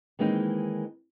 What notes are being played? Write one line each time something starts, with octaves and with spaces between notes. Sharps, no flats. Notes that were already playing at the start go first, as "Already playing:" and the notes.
D#3 E3 G#3 A#3 C4 D#4